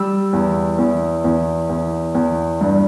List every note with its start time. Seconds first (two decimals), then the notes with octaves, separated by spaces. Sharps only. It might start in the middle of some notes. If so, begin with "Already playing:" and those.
Already playing: G3 E6
0.33 E2
0.78 E2
1.24 E2
1.69 E2
2.15 E2
2.61 G2